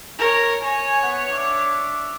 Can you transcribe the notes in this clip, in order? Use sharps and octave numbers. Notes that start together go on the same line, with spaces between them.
A#4 C#5
C#5 G#5
B3 F#5
D4 E5 D6